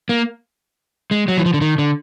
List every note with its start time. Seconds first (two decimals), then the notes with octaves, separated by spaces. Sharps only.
0.09 A#3
1.11 G#3
1.28 F#3
1.37 E3
1.46 F3
1.54 D3
1.61 D#3
1.78 D3